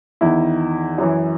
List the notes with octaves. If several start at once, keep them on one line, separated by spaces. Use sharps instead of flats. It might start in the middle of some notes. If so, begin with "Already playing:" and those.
E2 D#3 E4
F#2 E3